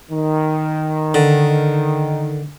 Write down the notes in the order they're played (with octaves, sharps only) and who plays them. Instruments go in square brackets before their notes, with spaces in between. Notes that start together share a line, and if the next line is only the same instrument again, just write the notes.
[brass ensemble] D#3
[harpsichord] D3